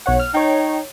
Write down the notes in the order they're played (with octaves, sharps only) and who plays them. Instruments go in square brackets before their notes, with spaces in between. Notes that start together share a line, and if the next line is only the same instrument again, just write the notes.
[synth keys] B1 C#5 F#5
F6
[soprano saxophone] D#4 [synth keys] C#5 G5